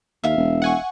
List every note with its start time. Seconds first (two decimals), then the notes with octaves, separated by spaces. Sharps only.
0.24 D#2 E5 F5
0.37 E1
0.62 F#5 G#5 C#6